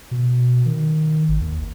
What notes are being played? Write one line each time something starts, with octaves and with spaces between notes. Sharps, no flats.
B2
D#3
G#1
D#2